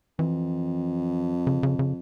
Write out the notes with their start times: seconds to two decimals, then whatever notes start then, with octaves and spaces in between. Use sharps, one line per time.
0.19 F2 E3
1.47 C#3
1.63 C#3
1.79 C#3